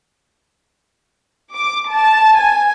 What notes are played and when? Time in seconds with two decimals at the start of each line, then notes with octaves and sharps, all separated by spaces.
1.53 D6
1.90 A5
2.37 G#5